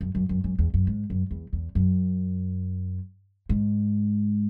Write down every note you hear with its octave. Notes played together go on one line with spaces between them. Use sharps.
F#2
F#2
F#2
F#2
E2
F#2
G#2
F#2
E2
E2
F#2
G#2